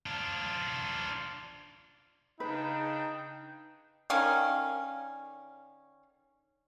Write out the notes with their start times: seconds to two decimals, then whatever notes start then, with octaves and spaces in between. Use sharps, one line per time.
0.06 D4 F4
2.40 C#3 D4 D#4 B4 G5
4.10 D3 D#3 C#4 F5